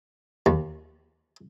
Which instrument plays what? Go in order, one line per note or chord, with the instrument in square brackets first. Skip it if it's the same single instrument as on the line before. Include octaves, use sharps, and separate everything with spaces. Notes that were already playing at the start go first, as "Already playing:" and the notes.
[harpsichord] D#2